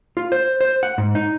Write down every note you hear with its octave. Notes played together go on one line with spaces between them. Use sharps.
F4
C5
C5
F#5
G#2
D#4